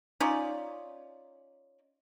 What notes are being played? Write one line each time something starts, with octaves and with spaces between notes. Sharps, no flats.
C#4 D#4 F4 D5